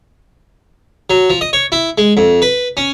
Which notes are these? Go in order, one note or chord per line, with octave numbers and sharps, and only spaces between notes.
F#3
F3
D#5
C#5
E4
G#3
F2
B4
C#4